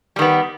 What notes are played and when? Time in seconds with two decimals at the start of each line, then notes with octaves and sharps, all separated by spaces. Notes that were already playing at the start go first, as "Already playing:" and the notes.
0.16 G3
0.19 D#3
0.22 B3